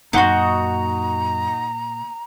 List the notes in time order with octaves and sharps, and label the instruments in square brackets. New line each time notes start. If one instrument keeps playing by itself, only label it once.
[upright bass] F#2 [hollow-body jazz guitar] A#2 F#5 C6 [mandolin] D#4 F#4 [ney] A#5